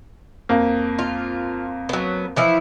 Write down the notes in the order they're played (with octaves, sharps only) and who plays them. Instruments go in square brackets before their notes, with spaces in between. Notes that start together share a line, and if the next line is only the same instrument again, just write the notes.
[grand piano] F2 A#3
[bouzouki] F4
F#3 B3
E3 F3 E4